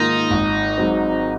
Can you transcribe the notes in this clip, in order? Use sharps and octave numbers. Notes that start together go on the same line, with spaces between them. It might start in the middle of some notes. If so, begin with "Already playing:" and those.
Already playing: G#2 D#3 A#3 D#4 F4 A#4
G#1
G#2 F#3 C4